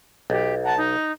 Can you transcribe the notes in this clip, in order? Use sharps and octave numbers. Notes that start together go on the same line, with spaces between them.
B1 G4
F#5 A5 A#5
D#4